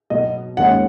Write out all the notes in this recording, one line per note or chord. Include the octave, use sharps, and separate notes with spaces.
B2 F#3 B3 D#5
D#2 D#3 G#3 C#4 F#5